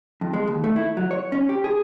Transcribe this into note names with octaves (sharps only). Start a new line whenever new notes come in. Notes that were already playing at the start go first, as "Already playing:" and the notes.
F2
G#3
D#2
A3
E4
F#3
C#5
C#4
G4
G#4